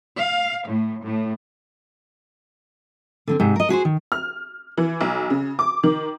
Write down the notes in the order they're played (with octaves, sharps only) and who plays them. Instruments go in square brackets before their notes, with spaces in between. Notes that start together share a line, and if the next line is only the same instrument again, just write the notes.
[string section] F5
A2
A2
[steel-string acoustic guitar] D3 A#3 C4
G#2 C3
A#4 D#5
F#4 G#4 B4 C5
D#3
[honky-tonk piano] F6
E3
B1
C#3
D6
D#3